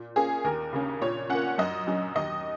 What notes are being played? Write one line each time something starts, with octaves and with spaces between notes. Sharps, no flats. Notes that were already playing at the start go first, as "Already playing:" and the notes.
Already playing: A#2
A#3 C#4 G#4
D#2 A#4
C#3 A#3 C#4
A#2 C#5
A#3 C#4 F#5
F#2 D#5
F#3 C#4
D#2 D#5